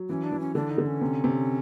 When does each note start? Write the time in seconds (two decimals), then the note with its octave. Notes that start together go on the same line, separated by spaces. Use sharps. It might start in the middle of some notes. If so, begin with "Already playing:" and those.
Already playing: F#3
0.09 E3 C#4
0.24 D4
0.32 E3
0.40 C#4
0.55 D3 D4
0.71 D#4
0.78 D3
0.86 C#4
1.01 C3
1.24 C3